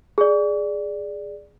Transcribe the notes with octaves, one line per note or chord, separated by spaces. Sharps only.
G#4 D5